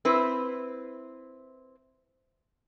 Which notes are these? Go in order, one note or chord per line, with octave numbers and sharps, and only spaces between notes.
C4 E4 B4